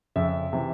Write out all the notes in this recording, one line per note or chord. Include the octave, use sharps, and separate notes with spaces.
F2 C#3 F3 E5
C3 E3